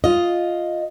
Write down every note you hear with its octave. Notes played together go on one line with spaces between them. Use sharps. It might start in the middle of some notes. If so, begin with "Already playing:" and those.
F4 D#5